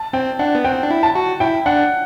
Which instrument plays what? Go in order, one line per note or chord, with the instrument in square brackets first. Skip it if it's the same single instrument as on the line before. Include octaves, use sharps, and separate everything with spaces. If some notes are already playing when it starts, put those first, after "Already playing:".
Already playing: [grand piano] A5
[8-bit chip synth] C4 [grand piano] G5
[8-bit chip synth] D4 [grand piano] F#5
[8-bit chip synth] B3
[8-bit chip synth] C4 [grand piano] G5
[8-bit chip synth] D4
E4
[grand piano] A5
[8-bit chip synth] F#4
[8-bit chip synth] E4 [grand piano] G5
[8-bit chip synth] D4 [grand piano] F#5